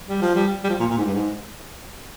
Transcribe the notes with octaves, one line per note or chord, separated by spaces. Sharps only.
G3
F3
G3
G3
F3
A#2
A#2
G#2
G2
G#2